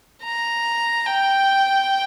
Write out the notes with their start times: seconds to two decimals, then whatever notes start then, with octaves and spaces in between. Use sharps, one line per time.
0.24 A#5
1.06 G5